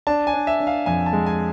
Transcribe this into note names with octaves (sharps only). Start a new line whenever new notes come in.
D4 A5
G#5
D4
E5
D4
F5
F2 G#5
A5
G#3
G#5